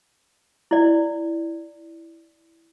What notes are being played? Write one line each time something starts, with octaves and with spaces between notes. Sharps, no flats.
E4 D5